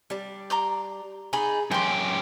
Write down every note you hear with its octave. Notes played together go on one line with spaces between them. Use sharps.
G3 D4
A#5 C6 D6
D#4 G#4 D5 B5
F#2 G4 G#4 G5 C6